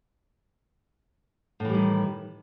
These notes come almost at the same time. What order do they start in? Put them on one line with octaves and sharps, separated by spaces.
A2 E3 G3 D#3